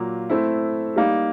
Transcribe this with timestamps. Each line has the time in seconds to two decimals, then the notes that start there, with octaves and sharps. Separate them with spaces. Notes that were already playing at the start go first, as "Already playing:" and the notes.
Already playing: A#2 F#3 A#3
0.30 A3 C4 E4
0.96 G3 A#3 D#4